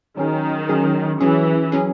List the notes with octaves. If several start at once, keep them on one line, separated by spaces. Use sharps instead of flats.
D#3 F#3 C#4 G#4
F#3 C#4 G#4
E3 F#3 C#4 G#4
F#3 C#4 G#4